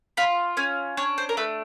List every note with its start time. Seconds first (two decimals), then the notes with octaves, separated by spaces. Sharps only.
0.17 F4 B5
0.57 C#4 G#5
0.97 D4 C#5
1.18 C5
1.29 A#4
1.37 A3 B4